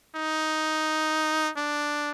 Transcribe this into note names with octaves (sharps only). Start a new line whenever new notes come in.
D#4
D4